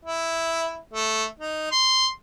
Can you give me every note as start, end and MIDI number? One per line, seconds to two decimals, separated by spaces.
0.05 0.75 64
0.94 1.24 57
1.40 1.71 63
1.72 2.07 84